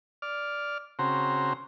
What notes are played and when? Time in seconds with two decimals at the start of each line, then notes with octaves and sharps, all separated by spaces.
0.22 D5 F6
0.99 C#3 C4 F#4 C5 A#5